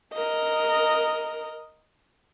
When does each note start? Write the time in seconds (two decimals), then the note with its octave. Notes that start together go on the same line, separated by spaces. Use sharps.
0.14 A#4 D#5